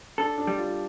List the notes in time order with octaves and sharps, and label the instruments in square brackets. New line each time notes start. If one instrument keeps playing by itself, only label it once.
[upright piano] D4 [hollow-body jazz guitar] A4
[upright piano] D4
[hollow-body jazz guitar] G3
[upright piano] F4